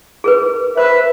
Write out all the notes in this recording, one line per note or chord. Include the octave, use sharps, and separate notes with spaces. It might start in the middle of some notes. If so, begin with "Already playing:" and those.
G#4 A#4 B4
B4 C5 E5